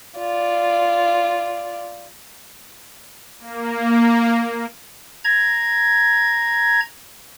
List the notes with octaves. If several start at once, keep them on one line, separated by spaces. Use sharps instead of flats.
F4 D5
A#3
A#5 G#6